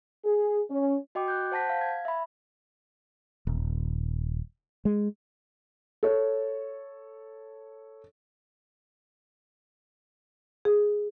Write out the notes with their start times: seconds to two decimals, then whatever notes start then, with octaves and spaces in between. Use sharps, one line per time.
0.25 G#4
0.70 C#4
1.15 F#4 D#5 G5 D6
1.28 F#6 G6
1.52 C5 F#5 A5 G6 A#6 B6
1.70 F5
1.81 G#6
2.05 E5 B5
3.47 D#1
4.85 G#3
6.03 A4 C#5
10.65 G#4